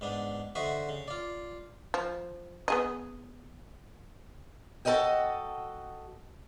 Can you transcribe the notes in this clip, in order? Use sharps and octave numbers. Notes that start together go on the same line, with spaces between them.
G#2 B3 D4
D3 F#4 C5 D#5 E5
C#3
F4 D5
F3
B3 G#4 D#5
F#4 A4 A#4 C#5 D#5 G5